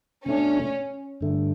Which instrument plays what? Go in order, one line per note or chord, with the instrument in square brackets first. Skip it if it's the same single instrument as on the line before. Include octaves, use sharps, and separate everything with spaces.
[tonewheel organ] B2 A3 D4 [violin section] C#4
[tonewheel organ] G2 D3 A3